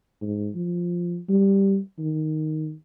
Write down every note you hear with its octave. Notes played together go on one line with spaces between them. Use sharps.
G#2
F3
G3
D#3